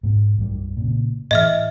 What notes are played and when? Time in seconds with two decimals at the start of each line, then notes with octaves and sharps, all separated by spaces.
0.03 G#2 B2
0.38 B1 F#2 G3
0.77 A#2 C#3
1.31 A2 E3 D#5 E5 F6